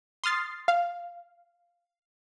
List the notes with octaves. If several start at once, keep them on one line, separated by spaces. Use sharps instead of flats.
C6 D#6 F6 A6 C7
F5